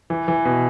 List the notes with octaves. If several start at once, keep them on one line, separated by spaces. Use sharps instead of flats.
E3
E3
B2